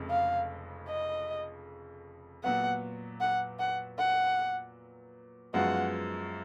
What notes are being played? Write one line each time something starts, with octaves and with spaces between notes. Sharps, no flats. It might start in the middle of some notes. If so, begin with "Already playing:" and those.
Already playing: F1 F2 C#3 G#3
F5
D#5
A#2 F#3 B3 F#5
F#5
F#5
F#5
F#2 F3 G#3 B3 F#4 F#5